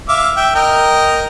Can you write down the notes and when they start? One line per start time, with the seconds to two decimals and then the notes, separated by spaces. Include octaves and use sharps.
0.09 E5 F5 D6
0.36 E5 G5
0.55 A#4 D#5 G5